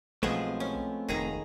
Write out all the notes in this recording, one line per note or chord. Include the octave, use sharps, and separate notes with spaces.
B1 F3 G#3 A3 B3 C4 G#4
C#4
F1 D#3 G#4 A#5